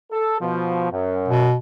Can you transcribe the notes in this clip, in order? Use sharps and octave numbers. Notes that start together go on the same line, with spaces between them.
A4
B2 F3
F#2
B2